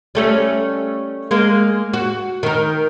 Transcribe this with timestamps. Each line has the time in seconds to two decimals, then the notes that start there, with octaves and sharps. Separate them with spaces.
0.15 G3 A3 C#4
1.31 G#3 A#3
1.94 F#4
2.43 D#3 A#4